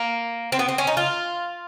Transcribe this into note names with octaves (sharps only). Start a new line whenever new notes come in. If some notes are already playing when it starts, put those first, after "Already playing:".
Already playing: A#3
C4
B3
C4
C#4
D#4
F4